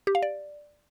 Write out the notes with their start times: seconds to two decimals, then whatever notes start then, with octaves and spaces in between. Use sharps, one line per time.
0.07 G4
0.15 F5
0.23 D5